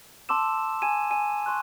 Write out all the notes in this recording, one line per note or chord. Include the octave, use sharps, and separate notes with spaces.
A5 C6 D6 E6 E7
G#5 G#6 D#7 E7
G#5 D#7
C6 C#6 F#6